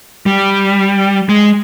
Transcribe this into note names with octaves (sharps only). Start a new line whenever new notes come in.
G3
G#3